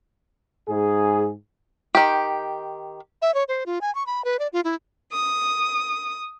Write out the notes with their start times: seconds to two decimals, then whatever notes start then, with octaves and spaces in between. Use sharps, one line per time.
0.68 G#2 G#4
1.95 D#3 G4
3.22 E5
3.34 C#5
3.48 C5
3.66 F4
3.81 G#5
3.95 C#6
4.06 B5
4.25 B4
4.39 D5
4.53 F4
4.64 E4
5.11 D#6